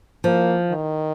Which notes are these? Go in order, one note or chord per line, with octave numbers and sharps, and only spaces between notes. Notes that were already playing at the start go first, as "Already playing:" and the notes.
F3 A#3
D#3